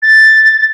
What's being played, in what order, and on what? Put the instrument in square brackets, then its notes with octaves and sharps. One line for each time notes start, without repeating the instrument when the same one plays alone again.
[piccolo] A6